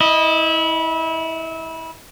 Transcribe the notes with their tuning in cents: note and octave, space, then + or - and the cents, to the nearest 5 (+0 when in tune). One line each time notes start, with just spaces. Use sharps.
E4 -25 D#5 +0